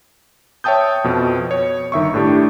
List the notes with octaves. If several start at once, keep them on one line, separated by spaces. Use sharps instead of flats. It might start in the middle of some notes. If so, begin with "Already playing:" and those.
C#5 E5 G5 A5 D#6 G6
F2 B2
C#5
G1 D#3 E5 C#6
A2 D4 G4